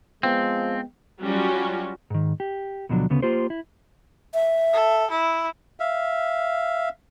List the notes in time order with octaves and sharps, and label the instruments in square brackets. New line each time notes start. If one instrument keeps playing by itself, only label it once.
[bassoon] F3 [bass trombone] G#3 [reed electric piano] B3 G5 [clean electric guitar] C4
[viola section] F#3 G3 C#4 F4 F#4
[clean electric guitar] G#2 D#3
G4
D2 B2 F3 F#3 D4
D2 C#3 B3
A#3 F4 G4 C5
E4
[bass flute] E5
[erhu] A4
E4
[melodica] E5 F5